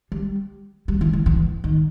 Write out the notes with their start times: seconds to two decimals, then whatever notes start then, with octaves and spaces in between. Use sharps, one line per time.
0.12 G3
0.88 G3
1.01 E3
1.13 E3
1.26 E3
1.64 D#3